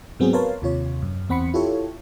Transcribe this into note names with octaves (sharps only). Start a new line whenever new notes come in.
G#2 F#3 B3 C4 F#4 G#4
A#4 B4 C#5 F5 A5 C6
D#2 C3 F4 C#5
F#2
E2 C4 F#5 B5 C6 C#7
E4 F4 G4 A4 C#5